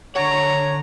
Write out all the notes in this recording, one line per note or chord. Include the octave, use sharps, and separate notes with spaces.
D3 C#5 F#5 A#5